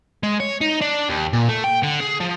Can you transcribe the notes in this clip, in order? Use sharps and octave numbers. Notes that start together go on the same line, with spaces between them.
G#3
C#5
D#4
D4
D#2
A#2
A3
G5
D3
G#4
F3